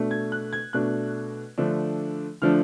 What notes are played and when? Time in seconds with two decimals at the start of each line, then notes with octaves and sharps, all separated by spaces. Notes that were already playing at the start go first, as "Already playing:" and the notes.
Already playing: B2 A3 D4
0.11 G#6
0.32 F#6
0.53 G#6
0.73 B2 A3 D4 F#6
1.58 D3 F3 A3 D4
2.42 D3 F3 A3 D4 F6